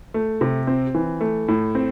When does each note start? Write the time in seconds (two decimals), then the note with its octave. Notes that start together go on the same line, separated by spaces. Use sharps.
0.14 A3
0.41 C3
0.67 C4
0.95 E3
1.21 A3
1.48 A2
1.75 C4